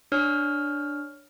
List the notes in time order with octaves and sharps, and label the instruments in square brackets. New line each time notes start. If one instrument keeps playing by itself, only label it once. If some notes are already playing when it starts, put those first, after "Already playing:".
[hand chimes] D4 C#5 F6